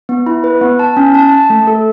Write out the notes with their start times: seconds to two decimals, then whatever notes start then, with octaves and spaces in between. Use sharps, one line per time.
0.09 B3
0.26 E4
0.44 B4
0.61 B3
0.79 A5
0.97 C#4
1.15 A5
1.32 A5
1.50 A3
1.67 A4